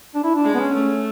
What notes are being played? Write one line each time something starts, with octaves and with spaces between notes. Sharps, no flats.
D4
E4
D4
G#3
B3
C#4
A3